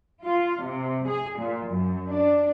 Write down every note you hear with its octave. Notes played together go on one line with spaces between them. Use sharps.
F4
C3
G#4
A#2
F#2
D4